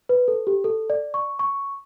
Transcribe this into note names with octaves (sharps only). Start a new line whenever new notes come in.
B4
A4
G4
A4
D5
C#6
C#6